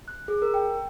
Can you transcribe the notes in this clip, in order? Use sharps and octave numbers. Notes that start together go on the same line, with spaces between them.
F#6
G#4
A#4
G5